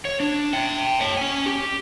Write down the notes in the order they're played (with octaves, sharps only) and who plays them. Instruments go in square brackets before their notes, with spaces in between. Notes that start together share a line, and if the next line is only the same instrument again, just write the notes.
[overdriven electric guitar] C#5
D4
E5 G5
C#5 A5
C#4 G#5
G4